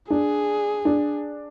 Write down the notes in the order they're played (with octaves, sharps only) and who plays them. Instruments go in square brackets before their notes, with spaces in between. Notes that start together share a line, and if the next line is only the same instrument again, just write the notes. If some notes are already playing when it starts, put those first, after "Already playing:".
[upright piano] D4 [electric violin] G#4
[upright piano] D4